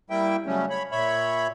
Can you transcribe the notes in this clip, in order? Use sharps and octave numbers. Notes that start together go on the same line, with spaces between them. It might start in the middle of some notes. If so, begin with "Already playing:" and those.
G3 A#3 E4 E5 G5
C#3 F#3 G3 A3 C#4
C#5 B5
A#2 C#5 E5 B5